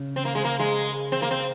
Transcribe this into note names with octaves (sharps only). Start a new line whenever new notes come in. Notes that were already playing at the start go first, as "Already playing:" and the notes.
Already playing: C#3
C4
A#3
G#3
A#3
G#3
C4
A#3
C4